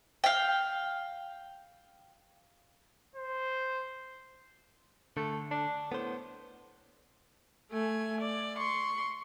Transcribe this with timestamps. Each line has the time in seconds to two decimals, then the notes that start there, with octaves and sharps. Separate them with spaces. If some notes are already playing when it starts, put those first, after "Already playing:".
0.24 F5 G5
3.16 C5
5.17 D3 A3
5.51 D4
5.92 A2 B3 C5
7.72 A3 G#5
8.20 D5
8.58 C6 C#6